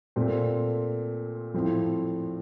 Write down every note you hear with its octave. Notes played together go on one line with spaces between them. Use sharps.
A#2 A3 C4
A2 F3 C4